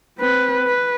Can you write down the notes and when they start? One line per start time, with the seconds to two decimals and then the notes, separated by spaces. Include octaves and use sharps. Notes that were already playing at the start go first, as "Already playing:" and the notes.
0.19 C4 B4
0.66 B4